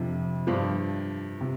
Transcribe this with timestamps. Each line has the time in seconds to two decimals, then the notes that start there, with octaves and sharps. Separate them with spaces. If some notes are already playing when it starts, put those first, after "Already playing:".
Already playing: F2 C3 F3 D4
0.47 G2 F3 D4
1.41 C3